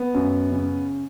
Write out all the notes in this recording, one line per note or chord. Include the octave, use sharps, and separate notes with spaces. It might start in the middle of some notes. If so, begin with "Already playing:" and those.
Already playing: B3
F#2
C#3